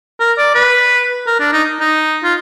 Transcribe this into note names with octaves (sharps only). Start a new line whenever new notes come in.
A#4
D5
B4
A#4
D4
D#4
D#4
F4